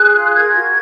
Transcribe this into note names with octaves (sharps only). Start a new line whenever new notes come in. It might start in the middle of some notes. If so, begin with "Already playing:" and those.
Already playing: G#4 F#6
F4
A#4 G#6
F#4